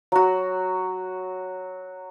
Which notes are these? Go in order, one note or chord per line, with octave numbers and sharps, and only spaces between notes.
F#3 F#4